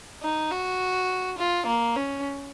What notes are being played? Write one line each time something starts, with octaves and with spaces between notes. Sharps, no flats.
D#4
F#4
F4
A#3
C#4